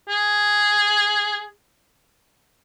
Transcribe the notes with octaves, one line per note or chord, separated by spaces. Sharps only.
G#4